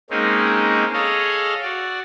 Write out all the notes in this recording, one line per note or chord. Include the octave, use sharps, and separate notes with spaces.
G#3 A#3 C4 C#4 D#4
G#4 A4 C#5 D#5 F5
F#4 D5